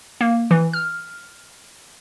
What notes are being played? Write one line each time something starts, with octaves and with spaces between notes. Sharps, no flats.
A#3
E3
F6